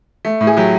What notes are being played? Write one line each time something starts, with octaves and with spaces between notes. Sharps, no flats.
A3
A2
G#4
F#3 G4